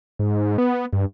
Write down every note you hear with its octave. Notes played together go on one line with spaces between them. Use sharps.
G#2
B3
G2